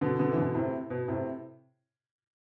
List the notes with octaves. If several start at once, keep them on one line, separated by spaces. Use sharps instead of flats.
B2 D3
B2 D3
E3
B2 D3
A2 C3
B2
A2 C3